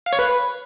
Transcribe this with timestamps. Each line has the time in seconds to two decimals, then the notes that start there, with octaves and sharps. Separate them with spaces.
0.06 F5
0.13 C#5
0.19 B4